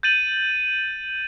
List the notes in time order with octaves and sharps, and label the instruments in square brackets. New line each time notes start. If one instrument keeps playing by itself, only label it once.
[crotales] G6 A6 D#7 F#7